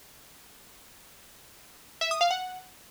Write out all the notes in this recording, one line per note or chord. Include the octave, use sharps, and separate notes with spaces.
E5
D#6
F5
F#5